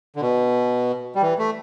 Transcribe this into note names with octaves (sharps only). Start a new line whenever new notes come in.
D3
B2
G3
E3
A3